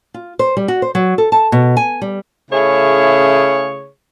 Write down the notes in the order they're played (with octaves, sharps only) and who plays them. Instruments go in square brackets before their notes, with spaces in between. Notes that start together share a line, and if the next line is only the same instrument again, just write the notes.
[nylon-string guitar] F4
C5
G3
F#4
C5
F#3
A4
A5
B2
G#5
G3
[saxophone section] C#3 A3 E4 G#4 C#5